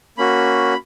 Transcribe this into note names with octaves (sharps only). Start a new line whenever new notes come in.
A#3 C#4 F#4 B5